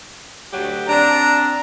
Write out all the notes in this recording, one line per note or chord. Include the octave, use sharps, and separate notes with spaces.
D2 F#3 G4
C4 D4 A#5